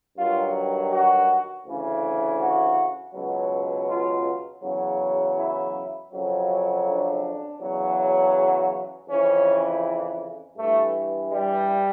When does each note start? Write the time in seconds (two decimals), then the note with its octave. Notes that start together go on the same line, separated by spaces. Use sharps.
0.16 G2 D#3 F#3 F4
0.91 F#4
1.65 D2 C#3 E3
2.39 F#4
3.14 C#2 B2 F#3
3.88 F4
4.62 E2 C#3 F#3
5.36 E4
6.11 F2 C#3 F#3
6.85 D4
7.59 E2 C#3 F#3
9.08 F2 C#3 E3 C#4
10.57 G2 E3 A3
11.31 G3